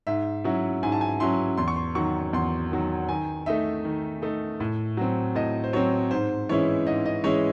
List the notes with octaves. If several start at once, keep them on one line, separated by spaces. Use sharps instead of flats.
G#2 E5
F#3 C#4 E4
G#2 G#5
A5
G#5
F#3 C#4 E4 C6
E2 C6
C#6
C6
D#3 F#3 C#6
E2 C6
D#3 F#3
D#3 G#5
A3 D#4 E5
D#3
A3 D#4
A2
F#3 C4
A2 D#5
C5
F#3 C4 C#5
G#2 C5
E3 G#3 C#4 E4 C#5
G#2 D#5
D#5
E3 G#3 C#4 E4 C#5